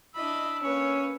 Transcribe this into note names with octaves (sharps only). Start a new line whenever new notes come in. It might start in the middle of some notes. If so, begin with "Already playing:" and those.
D4 E4 D#5 B5 E6
A#3 C#4 B4 C#5